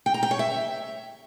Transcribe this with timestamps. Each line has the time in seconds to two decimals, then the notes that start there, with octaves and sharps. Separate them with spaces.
0.06 G5
0.14 A#5
0.23 G5
0.31 C#5
0.39 E5